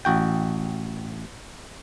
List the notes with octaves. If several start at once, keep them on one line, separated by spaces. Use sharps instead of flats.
A1 F#4 G5